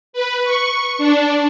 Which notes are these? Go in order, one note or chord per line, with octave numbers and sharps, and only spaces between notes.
B4
C#6
D4